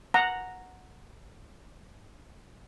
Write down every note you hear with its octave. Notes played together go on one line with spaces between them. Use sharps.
F#5 A#5